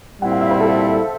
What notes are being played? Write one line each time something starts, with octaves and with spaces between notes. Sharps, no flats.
A#2 G3 C4 E4 F#5
F5
E5
C5
A4